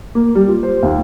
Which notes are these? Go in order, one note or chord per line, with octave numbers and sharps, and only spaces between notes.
A#3
G3
F4
C5
D#2